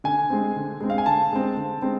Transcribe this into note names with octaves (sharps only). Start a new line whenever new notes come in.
D3 G#5
G#3 C4
D3
G#3 C4
F5
G#5
D3 A5
G#3 C4
D3
G#3 C4